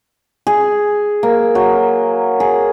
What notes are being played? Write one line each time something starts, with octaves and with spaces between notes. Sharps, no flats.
G#4
A#3
F#3
G#4